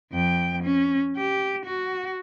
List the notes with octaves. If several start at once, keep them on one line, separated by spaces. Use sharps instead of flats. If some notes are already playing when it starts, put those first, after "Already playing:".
F2 G5
C#4
G4
F#4